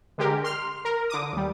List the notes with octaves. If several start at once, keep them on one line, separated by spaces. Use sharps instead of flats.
D3 G#3 G4 A#4
C6 F6
A#4
D3 D6 D#6
D#2 G3